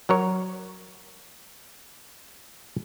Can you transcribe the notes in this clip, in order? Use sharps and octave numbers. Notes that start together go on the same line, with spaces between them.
F#3 A#4 C#5